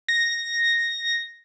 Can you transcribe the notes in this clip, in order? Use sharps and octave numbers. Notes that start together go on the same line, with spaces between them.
A#6